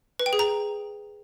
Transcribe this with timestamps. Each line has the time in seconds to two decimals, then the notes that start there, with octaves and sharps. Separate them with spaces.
0.19 B4
0.26 G5
0.33 G#4
0.39 A#5